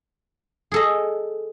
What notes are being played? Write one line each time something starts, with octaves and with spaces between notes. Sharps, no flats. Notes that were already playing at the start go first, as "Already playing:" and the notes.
G#4 A4 D#5